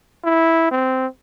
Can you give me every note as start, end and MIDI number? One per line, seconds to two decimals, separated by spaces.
0.24 0.70 64
0.72 1.07 60